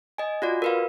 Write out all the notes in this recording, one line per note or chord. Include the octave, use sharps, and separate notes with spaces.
D#5 G#5
F4 F#4 D5
A#4 B4 F5